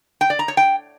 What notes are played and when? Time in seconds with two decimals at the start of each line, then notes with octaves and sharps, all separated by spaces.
0.21 G5
0.30 D5
0.39 A#5
0.48 C#5
0.57 G5